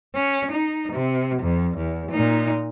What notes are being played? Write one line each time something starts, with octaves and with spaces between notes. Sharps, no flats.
C#4
D#4
C3
F2
E2
A#2 D#4